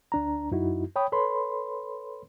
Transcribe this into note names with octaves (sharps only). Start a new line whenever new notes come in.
D2 D4 A#5
F#2 D#4 E4 F#4
C#5 G5 B5 D#6
A4 B4 C#5 B5 C6